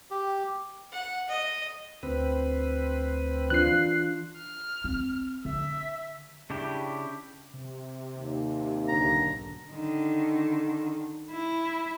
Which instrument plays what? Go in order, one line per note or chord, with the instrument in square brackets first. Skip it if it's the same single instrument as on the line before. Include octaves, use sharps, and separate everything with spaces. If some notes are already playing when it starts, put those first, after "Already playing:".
[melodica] G4
[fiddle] F#5
D#5
[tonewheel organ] D2 C4 B4
[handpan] E3 D4 F4 [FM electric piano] F#6 C7
[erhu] F6
[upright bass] C4
[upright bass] D3 [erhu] E5
[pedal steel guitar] C#3 D4 E4 G4
[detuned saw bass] C3
[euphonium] D#2
[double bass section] B1 G#2 D3 [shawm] A#5
[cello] D3 D#3
E4